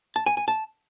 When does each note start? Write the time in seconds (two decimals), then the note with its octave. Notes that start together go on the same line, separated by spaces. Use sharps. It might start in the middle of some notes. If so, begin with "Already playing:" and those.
0.16 A5
0.26 G#5
0.37 G#5
0.48 A5